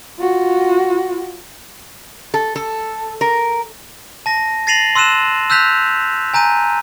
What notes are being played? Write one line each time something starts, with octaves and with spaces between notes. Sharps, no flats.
F4 F#4
A4
A4
A#4
A5 A#6
A6 A#6 C7 D#7 F7 F#7
C6 E6 F#6 D#7 E7
E6 F#6 G6 B6 F7
G#5 A#5 G6 D#7